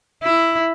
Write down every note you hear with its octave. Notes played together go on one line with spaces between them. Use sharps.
E4